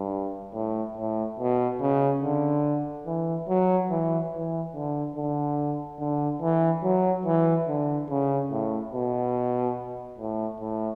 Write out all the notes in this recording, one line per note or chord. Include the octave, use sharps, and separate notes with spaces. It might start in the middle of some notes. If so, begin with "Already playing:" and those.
Already playing: G2
A2
A2
B2
C#3
D3
E3
F#3
E3
E3
D3
D3
D3
E3
F#3
E3
D3
C#3
A2
B2
A2
A2